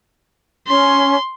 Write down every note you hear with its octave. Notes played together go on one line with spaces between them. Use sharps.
C#4 C6